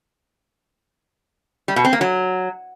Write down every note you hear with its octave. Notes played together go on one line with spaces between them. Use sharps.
G3
B2
C4
A#3
F#3